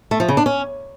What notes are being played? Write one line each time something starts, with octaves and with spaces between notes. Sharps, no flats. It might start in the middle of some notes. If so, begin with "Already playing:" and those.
A3
F3
C#3
D4
C#4